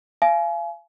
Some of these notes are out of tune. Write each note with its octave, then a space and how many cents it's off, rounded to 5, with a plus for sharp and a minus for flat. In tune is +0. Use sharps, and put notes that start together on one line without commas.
F5 -35 G#5 +35